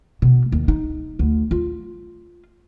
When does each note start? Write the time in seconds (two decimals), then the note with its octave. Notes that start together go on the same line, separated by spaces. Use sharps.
0.22 B2
0.52 D#2
0.68 D#4
1.19 D2
1.51 F4